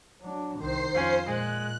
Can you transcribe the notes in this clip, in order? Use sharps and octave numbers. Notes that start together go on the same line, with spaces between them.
F#3 D4
C2 D#3 C5 C7
F2 C#4 F4
A#2 G#3 F#6